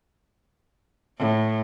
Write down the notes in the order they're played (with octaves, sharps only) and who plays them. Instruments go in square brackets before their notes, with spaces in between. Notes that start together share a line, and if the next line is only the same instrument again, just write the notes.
[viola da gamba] A2